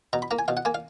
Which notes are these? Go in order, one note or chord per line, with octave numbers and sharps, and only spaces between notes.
B2 A#5
B5
A#3 A#5
G#5
B2 F5
F#5
A#3 G#5
F5